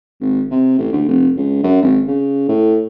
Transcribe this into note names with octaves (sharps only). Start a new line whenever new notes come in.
G#1
C3
A1
D2
F1
C#2
F#2
G#1
C#3
A2